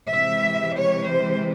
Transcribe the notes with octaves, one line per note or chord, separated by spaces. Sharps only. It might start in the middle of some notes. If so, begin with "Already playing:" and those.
C3 E3 G#3 E5
C#5
C5